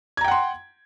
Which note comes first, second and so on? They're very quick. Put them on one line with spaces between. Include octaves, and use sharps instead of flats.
G#6 A#5 G5 F#5 C6